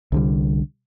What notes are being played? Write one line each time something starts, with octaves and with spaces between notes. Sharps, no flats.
C2 D3 G3